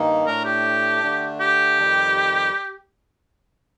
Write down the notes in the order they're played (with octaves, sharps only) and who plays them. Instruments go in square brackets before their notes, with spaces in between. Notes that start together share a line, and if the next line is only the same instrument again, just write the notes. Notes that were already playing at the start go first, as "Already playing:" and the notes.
Already playing: [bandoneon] G2 D#3 A#3 D#4
[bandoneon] A2 A3 D4 [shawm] A#4
[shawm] G4
[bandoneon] D3 A3 D4
[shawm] G4
[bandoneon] F2 D#3 G3